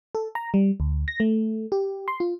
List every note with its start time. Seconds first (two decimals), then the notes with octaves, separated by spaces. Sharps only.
0.15 A4
0.35 A#5
0.54 G3
0.80 D2
1.08 A#6
1.20 A3
1.72 G4
2.08 C6
2.20 F4